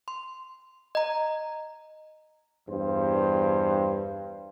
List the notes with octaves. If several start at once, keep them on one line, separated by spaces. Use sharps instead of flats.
C6
D#5 A#5
E2 G2 C5